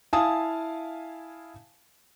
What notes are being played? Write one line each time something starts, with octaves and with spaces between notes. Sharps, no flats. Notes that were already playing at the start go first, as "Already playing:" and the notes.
E4 F5 G#5 A5 D#6